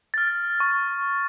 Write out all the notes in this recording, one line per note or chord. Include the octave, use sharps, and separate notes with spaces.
F6 A6
C#6